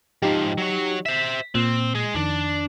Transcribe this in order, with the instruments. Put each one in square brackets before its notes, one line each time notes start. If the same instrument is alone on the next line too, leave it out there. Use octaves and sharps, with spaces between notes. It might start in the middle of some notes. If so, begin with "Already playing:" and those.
[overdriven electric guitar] G#2 F3 [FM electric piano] D#4 G4
[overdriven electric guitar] F#3 C#5
[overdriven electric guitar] C5 E5 [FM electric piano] B6
[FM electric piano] A#2 [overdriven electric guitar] C4
[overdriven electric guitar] G#3 G#4
[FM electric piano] F2 D#3 [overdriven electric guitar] D4